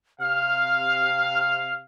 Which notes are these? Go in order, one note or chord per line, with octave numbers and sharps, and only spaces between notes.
C3 F5 F6